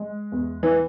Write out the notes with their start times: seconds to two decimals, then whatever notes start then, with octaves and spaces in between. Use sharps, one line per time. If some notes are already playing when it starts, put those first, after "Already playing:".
Already playing: G#3
0.32 E2
0.63 E3